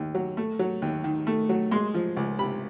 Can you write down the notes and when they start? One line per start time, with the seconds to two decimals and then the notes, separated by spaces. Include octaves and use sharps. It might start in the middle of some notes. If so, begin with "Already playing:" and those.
Already playing: D#2
0.15 F#3
0.37 A3
0.59 F#3
0.82 D#2
1.04 D#3
1.27 A3
1.49 F#3
1.71 G#3 C6
1.94 F3
2.17 C#2
2.39 C3 B5